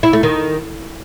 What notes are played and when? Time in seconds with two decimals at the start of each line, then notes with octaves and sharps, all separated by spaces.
0.03 E4
0.13 A3
0.23 D#3